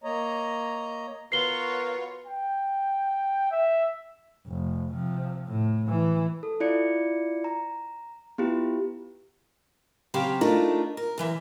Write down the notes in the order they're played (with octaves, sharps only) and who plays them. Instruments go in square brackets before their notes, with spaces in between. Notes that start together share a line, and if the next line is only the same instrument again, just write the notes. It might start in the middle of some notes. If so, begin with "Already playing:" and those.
[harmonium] A#3 C#5 D#5 A#5
[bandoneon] B3 F#4 A#4 [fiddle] F4 C#5 [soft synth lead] B4 [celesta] C7 G7
[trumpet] G5
E5
[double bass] F1
C3 F3
A2
E3
[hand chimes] A4
E4 F4 D5 C#7
A#5
B3 E4 F4 G4
[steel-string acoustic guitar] C#3 F#3 C4 G4 C#5 F5
A3 D4 D#4 F4 A#4
A#4
F#2 E3 E5